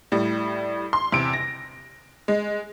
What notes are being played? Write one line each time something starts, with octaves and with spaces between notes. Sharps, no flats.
A2 G3
C6
E2 C3 D7
A#6
G#3